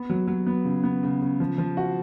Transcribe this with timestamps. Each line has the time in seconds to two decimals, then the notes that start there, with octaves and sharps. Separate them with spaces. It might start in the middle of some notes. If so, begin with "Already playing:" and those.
Already playing: B3
0.10 F#3
0.28 F#3
0.47 B3
0.65 C#3
0.84 B3
1.03 C#3
1.22 C#3
1.40 F3
1.58 F3
1.77 F#4